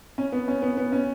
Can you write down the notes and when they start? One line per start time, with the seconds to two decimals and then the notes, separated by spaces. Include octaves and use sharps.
0.18 C#4
0.32 B3
0.48 C#4
0.62 B3
0.77 B3
0.92 C#4